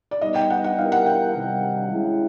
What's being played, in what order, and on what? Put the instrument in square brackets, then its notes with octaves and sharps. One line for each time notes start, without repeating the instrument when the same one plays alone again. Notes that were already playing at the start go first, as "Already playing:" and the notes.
[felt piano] D5
[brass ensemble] G3 B3 D#4 [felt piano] D#5
[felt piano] G5
F#5
F#5
[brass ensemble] G3 B3 E4 G4 A#4 [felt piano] F5
[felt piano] F#5
G5
[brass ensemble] C3 D#3 G3
G#3 C#4 E4